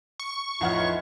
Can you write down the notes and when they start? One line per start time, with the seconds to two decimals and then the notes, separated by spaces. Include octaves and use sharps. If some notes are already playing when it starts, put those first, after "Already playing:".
0.20 C#6
0.61 A1 F2 E3 D#4 F4 C#5 F#5 F6